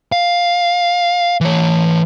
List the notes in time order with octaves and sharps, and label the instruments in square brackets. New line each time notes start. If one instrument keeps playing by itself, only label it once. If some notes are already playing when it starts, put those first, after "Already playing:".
[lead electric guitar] F5
E3 C#5